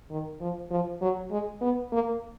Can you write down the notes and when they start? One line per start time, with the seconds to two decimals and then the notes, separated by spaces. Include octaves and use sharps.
0.10 D#3
0.41 F3
0.71 F3
1.01 F#3
1.31 G#3
1.61 B3
1.92 A#3